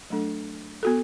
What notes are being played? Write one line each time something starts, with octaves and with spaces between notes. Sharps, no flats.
F#3 A3 D4 A4
B3 F#4 A4